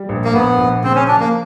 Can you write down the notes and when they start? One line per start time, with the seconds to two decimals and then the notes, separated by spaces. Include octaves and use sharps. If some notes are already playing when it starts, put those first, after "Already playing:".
Already playing: G3
0.09 A#1
0.25 A#3
0.34 A#1 B3
0.58 A#1
0.83 C#3 C4
0.95 C#4
1.08 F3 D4
1.20 A#3